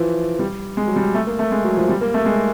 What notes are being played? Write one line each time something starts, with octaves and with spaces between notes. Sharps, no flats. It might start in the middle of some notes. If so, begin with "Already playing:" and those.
Already playing: E3 F3
G3
G#3
F#3
G3
A3
A#3
A3
G#3
F#3
F3
G3
A#3
A3
G#3